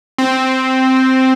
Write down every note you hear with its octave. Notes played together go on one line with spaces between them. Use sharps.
C4